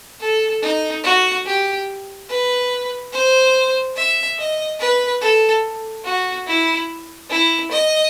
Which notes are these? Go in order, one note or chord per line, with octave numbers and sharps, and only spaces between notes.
A4
D#4
F#4
G4
B4
C5
E5
D#5
B4
A4
F#4
E4
E4
D#5